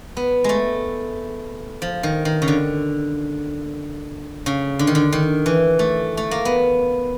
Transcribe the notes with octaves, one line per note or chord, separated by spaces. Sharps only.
B3
G#3 A3
F3
D#3
D#3
C#3
D3
C#3
D3
D#3
D3
D#3
E3
A3
A3
A#3
B3